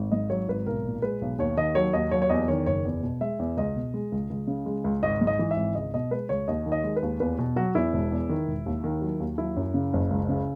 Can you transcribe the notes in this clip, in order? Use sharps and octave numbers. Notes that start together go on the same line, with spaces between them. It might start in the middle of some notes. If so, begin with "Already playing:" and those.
Already playing: G#1
G#2 D#5
F#3 C#5
G#1 B4
B1 A#4
A#2
G#3 B4
B1
D#2 C#5
D#3 D#5
F#3 C#5
D#2 D#5
F#3 C#5
C#5
E2 D#5
D#3 C#5
F#1 C#5
E2
B2
G#3 E5
E2
C#2 D#5
B2
G#3
C#2
C#2
C#3
G#3
C#2
G#1 D#5
G#2
D#5
E3
E5
G#1
C#2 D#5
B2 D#5
G#3 B4
C#2 C#5
D#2 D#5
D#3
D#5
G#3
B4
D#2
E2 B4
B2
F#3 F#4
E2 E4
E1
E2
D#3
E1
D#2
D#3
F#3
D#2
F#3 E4
F#2
C#3
F#1
C#2
C#3